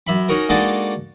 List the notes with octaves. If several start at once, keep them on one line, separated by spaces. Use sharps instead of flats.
F#2 E5 B5
C#4 D#4 F#4 A#4
G#3 A#3 D4 D#4 F#4 A4